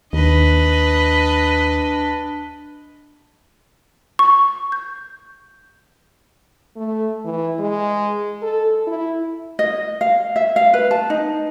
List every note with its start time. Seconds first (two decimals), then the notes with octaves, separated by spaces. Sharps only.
0.13 D#2 D4 B4 D#5
4.19 C#6
4.72 G6
6.76 A3
7.25 E3
7.59 G#3
8.42 A4
8.87 E4
9.59 D#5
10.01 F5
10.36 E5
10.56 F5
10.74 B4
10.91 A5
11.10 D#4